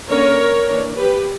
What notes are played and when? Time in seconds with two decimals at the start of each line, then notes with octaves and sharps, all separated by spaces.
0.09 D3 A#3 C#4 A#4 C#5
0.68 E3 A#3 D4
0.97 G4 B4